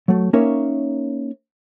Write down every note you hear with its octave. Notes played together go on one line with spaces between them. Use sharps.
F#3 A3
A#3 C#4 D#4 A#4 C#5 E5